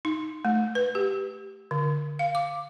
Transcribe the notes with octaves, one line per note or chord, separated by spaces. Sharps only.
D#4
A3
B4
G4
D3
F5
D6